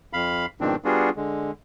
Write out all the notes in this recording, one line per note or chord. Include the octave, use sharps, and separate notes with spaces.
F2 F5 B5
G#2 B2 D#3 F3 C4 D4
G3 B3 D4 F4 F#4 G#4
D3 G#3